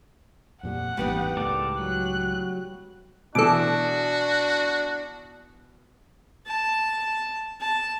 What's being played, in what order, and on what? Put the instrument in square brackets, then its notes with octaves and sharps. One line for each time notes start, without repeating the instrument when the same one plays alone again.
[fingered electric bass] F2 A#2 G3 [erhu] F#5
[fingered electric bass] G#1 E2 A2 [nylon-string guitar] G3 B3 D#4
[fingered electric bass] C#2 A2 [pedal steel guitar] A4 A#4 D5
[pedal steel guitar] F#3 [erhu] F#6
[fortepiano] B2 E3 [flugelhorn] D4 [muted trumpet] F#4 [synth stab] A4 D6
[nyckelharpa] A5
A5